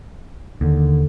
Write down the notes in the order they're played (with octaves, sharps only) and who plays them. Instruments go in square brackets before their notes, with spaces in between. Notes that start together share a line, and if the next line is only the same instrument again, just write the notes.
[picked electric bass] D#2 [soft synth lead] D3